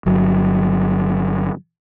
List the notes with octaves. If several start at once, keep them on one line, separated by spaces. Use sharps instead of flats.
G1 F#3